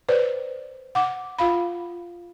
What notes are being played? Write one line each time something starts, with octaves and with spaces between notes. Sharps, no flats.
B4 C5 D5
F#5 D6
F4 F5 B5